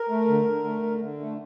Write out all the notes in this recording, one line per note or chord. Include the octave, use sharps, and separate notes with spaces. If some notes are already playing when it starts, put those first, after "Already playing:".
Already playing: A#4
A3
D3
D3
A3
D3
D3
A3